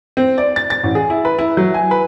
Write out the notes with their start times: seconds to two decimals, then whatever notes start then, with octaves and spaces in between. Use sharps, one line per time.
0.17 C4
0.38 D5
0.56 A6
0.70 A6
0.83 A1
0.95 G#4
1.10 E4
1.25 B4
1.39 E4
1.57 F#3
1.74 G#5
1.91 B4